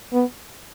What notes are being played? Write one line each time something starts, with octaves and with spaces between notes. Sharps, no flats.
B3